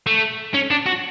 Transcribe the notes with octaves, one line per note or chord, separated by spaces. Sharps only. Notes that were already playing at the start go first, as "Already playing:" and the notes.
A3
C#4
D4
F#4